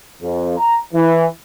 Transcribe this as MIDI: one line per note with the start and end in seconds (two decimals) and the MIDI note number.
0.22 0.57 41
0.58 0.79 82
0.93 1.25 52